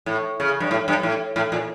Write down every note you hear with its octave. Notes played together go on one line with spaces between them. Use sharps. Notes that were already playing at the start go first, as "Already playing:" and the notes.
A2
C#3
G2
A2
G2
A2
A2
A#2